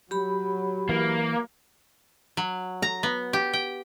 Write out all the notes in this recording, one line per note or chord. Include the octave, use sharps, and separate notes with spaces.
F#3 G4 B5
E3 A#3
F#3
A#5
B3
G4
G5